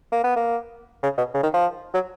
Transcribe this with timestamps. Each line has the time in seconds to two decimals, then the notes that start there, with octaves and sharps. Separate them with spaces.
0.12 A#3
0.24 B3
0.36 A#3
1.03 C#3
1.18 B2
1.34 C#3
1.43 D#3
1.54 F3
1.94 F#3